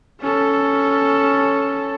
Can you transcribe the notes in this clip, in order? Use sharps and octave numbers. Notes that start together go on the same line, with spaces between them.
C#4 A4